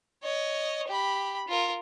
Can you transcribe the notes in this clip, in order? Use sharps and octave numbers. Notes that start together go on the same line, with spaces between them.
C#5 D#5
G4 B5
F4 A#4